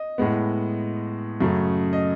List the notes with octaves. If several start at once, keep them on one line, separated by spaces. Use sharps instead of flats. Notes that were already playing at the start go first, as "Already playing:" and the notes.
Already playing: D#5
A2 G#3 B3
F#2 C#3 F#3 A3
D#5